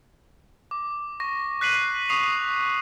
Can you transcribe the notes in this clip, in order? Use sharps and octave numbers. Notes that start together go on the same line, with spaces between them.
D6
C#6 A#6
F#6 B6 C7 D#7 F#7
C#6 D#6 C7 F7